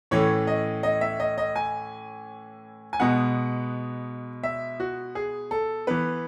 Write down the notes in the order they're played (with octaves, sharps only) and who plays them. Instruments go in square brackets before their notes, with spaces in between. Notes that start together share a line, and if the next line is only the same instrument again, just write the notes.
[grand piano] A2 E3 A3 C#4 C#5
D#5
D#5
E5
D#5
D#5
G#5
G#5
B2 G#3 B3 F#5
E5
F#4
G#4
A4
E3 B3 B4